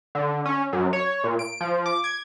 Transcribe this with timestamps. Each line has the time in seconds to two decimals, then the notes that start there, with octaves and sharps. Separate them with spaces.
0.15 D3
0.46 C#4
0.73 F#2
0.93 C#5
1.24 A#2
1.39 D7
1.61 F3
1.86 D6
2.04 G#6